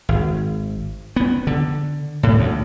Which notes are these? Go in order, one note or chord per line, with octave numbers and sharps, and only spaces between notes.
G#1
B3
D3
A2
D2